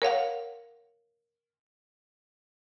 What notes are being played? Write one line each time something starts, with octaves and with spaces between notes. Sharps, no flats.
A#4 C#5 F5 F#5